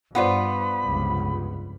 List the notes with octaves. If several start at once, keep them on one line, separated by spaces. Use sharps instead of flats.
G2 B3 F4 B4 C5 D5 F#5 B5
F1 C#2 G2